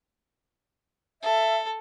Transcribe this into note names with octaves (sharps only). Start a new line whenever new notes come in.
A4 E5